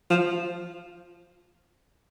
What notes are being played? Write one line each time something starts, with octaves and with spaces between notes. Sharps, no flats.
F3